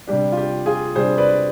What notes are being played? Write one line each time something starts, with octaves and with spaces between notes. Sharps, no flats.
C3 G3 D4 G4
F4
G4
F4 G#4
C3 G3 D4 G#4 C5
B4 D5